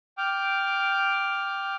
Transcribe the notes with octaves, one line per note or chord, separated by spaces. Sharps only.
G5 D6 F6